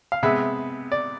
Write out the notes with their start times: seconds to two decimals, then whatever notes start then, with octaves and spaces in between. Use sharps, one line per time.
0.12 F5
0.23 C3 G#3 B3 E5
0.92 D5